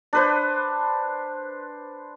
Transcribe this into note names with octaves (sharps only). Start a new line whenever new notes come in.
D4 B4 C5